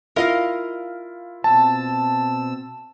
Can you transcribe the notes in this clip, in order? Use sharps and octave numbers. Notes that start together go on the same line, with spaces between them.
E4 F4 A#4 D#5 F5
B2 C4 A5 E6